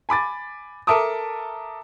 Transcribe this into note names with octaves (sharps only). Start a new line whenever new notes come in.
G#5 B5 D6 A6
A4 A#4 E5 A5 D6 D#6